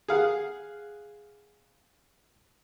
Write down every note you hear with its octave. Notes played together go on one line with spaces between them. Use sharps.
G#4 F5 F#5